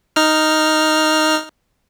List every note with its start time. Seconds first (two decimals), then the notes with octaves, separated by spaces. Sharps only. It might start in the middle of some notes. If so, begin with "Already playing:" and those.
0.16 D#4 F6